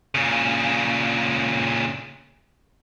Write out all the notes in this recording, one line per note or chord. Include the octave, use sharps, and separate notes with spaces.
A#2 C#3